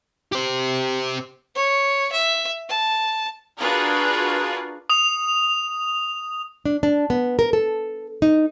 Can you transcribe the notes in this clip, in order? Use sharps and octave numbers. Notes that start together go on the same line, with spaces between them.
G4 C5
C#5
E5
A5
D4 F4 F#4 G#4 A#4 B4
D#6 F7
D4
D4
B3
A#4
A4
D#4